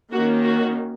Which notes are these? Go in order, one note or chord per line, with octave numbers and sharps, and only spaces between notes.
D#3 A#3 C#4 F#4
F#4